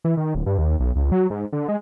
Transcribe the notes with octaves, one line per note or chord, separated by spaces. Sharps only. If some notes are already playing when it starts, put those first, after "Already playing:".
E3
D#3
D1
G2
D#2
B1
C#2
F#3
G#2
D3
G#3